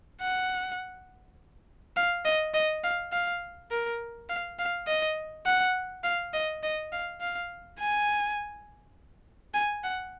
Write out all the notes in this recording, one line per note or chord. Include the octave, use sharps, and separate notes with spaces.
F#5
F5
D#5
D#5
F5
F5
A#4
F5
F5
D#5
F#5
F5
D#5
D#5
F5
F5
G#5
G#5
F#5